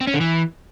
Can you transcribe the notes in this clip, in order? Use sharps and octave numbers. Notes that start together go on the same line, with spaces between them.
C4
C#4
D3
E3